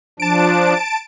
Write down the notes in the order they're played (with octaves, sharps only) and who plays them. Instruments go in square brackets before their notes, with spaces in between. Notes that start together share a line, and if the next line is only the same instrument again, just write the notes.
[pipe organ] F3 D4 [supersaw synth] A5 D7